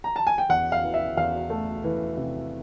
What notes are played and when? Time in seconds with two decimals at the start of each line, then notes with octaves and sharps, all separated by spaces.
0.04 A#5
0.16 A5
0.27 G#5
0.38 G5
0.49 E2 F#5
0.72 F5
0.84 E3
0.94 E5
1.17 E2 F5
1.50 A3
1.84 E3
2.17 C3